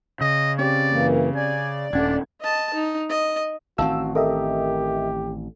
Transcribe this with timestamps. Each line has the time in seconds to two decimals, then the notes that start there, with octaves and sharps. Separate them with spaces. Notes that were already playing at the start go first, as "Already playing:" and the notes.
0.21 C#3 D#5
0.58 C4 C#4 G4 D5
0.90 F#2 E3 A#3
1.36 D5 G#5
1.93 D#1 A3 C#4 D4 F#5 G#6
2.41 D#5 A5
2.74 D#4
3.09 D#5
3.78 A1 D#3 C4 F#4 A#4 F5 A5 E6
4.15 G4 A4 A#4 D#5 E5